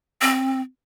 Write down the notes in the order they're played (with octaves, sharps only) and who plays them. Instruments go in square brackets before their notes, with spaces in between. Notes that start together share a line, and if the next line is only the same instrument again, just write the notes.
[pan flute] C4